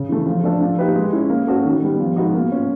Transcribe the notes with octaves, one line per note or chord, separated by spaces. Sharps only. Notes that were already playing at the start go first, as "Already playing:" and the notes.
Already playing: C#3
E3 A3
F3
A3 D4 F4 A4
F3
A#3 D#4 G4 B4
G#3
C#4 E4
A#3
C#4 F#4 A4
D#3
G3 B3
F3
G#3 B3 D#4 F#4
A#3
C#4 F4